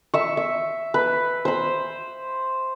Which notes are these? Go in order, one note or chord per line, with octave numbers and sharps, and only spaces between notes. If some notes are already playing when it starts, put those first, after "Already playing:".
E5 C#6
E5
B4
C5 B5